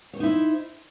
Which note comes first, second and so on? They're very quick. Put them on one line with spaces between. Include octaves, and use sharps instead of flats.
C#5 C5 D#4 E4